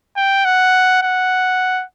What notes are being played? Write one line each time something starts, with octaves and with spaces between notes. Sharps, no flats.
G5
F#5
F#5